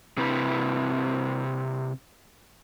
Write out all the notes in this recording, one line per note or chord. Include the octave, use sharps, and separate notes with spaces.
C3 C4 E4 B4